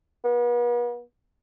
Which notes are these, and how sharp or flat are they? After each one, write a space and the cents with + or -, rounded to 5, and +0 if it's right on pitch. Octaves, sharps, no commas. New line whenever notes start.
B3 -40